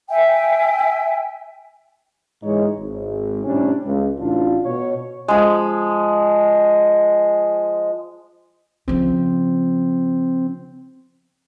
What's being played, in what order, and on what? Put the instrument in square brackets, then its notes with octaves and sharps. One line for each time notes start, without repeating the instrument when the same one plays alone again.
[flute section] E5 G5 G#5
[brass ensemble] G#2 E3 G#3 D#4 C#5
G#1
A2 C3 G3 C#4 D4
C#2
A1 D4 F4
B2 C#5
[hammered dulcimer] F3 G#3
[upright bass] C#3 F3 [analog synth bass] C4